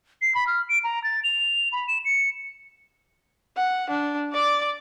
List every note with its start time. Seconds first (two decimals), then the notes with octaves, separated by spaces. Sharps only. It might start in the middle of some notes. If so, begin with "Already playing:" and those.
0.22 C7
0.35 B5
0.47 F6
0.69 D7
0.84 A#5
1.04 A6
1.24 F7
1.72 B5
1.88 E7
2.05 C#7
3.57 F#5
3.90 D4
4.33 D5 D6